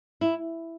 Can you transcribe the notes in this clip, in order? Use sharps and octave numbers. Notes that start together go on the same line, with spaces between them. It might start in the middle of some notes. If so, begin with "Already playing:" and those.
E4